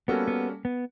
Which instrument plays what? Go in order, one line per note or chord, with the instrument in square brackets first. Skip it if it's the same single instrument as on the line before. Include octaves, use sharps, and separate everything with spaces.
[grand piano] G3 A#3 C#4 F#4 A4 [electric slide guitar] B3
[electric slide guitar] B3
B3